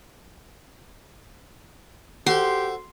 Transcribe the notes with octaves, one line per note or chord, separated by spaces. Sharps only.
F#4 G4 A4 C5 C6